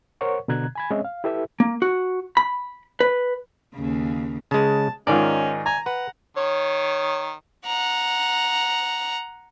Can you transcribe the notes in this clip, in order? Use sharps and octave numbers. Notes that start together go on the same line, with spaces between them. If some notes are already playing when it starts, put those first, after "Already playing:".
A#4 C5 C#5 F#5 C#6
B2 D3 A#5 F#6 G#6
G#5 B5 G#6
G#3 C4 C#4 C#5 D#5 E5
F5
E4 G4 A4 B4 E5
A#3
F#4
B5
B4
D#2 C#3
C#3 G#3 A5
G#2 D#3 C#4 F4 D5
G#5 A#5
B4 F#5
D#3 C#5
F#5 A#5